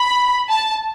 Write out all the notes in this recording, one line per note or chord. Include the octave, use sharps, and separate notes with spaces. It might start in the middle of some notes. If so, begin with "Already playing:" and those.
Already playing: B5
A5